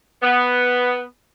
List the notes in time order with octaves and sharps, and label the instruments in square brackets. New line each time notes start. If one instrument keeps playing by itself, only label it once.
[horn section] B3